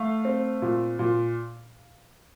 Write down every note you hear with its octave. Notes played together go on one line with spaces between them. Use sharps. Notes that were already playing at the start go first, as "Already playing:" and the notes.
Already playing: A3 F5
C4
A#2
A#2